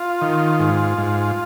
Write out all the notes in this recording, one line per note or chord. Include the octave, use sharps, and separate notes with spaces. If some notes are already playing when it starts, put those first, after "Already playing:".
Already playing: F4
D#3
G#2
G#2